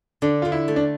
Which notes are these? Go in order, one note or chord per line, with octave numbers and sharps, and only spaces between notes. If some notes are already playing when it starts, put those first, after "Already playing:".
D3 D4
D3 F4
E4
A3
D4